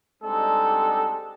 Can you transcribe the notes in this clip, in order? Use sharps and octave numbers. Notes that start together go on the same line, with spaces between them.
G3 G#3 C4 D4 D#4 A4